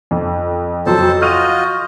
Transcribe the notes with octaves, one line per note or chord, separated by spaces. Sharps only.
F2
F2 F#3 A4 C5 A5
F4 F#4 D#5 F6 G6 D#7